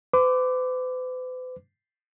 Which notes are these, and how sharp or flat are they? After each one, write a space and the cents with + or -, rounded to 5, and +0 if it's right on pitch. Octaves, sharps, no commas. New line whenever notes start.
B4 +45 D6 +0